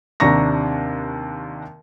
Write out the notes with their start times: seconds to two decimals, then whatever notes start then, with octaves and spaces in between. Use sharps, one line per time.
0.20 D#2 C3 D4 A#5 C#6 A#6